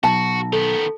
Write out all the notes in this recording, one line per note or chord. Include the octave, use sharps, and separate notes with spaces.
B1 F#4 A5
D#3 B3 A4